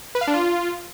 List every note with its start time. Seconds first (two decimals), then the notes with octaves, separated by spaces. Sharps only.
0.15 B4
0.21 F5
0.27 D4
0.34 F4